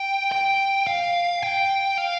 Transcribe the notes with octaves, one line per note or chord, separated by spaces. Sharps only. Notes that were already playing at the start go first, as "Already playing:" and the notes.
Already playing: G5
G5
F5
G5
F5